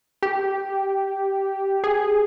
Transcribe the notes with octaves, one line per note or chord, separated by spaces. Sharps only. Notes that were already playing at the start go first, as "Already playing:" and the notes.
G4
G#4